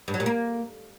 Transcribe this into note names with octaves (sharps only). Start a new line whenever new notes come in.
G2
F#3
A#2
A#3